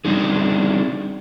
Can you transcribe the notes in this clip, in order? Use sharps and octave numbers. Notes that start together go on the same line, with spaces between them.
G3 C4 D4 D#4 G#4